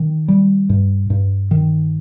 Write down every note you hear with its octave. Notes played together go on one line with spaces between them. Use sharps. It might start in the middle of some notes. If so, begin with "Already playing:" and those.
Already playing: D#3
G3
G2
G2
D#3